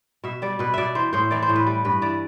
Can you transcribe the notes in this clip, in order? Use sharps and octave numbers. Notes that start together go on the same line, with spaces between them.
B2 E5
G3 D5
B2 B4
B2 D5 E5
E3 C5
A2 C5
E3 D5
C5
A2
B4
G3
G2 B4
E3 D5